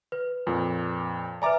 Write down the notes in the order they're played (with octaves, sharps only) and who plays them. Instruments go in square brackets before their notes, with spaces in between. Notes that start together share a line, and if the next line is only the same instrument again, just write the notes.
[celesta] B4
[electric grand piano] F2 A#2
[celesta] B4 E5 G#5 [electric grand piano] D5 A#5 D6